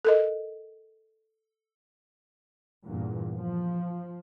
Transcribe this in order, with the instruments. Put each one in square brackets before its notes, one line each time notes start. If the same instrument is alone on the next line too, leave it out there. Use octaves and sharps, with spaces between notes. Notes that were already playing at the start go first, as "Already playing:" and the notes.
[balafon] A4 A#4 D#5
[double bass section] E2 G2 A#2
F3